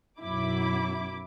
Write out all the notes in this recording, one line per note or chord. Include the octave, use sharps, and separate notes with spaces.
B1 F#2 E4 D6